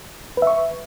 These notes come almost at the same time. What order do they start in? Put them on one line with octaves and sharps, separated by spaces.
B4 E5 C#6